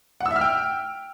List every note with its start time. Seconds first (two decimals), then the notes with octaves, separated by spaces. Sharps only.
0.20 F#5
0.26 E6
0.31 E5
0.36 F6
0.41 G5